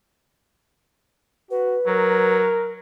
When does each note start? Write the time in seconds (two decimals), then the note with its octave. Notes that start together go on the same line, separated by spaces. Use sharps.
1.51 F#4 B4
1.87 F#3 A#4